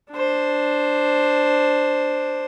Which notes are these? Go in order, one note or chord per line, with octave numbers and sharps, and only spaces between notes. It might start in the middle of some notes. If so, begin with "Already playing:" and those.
D4 C5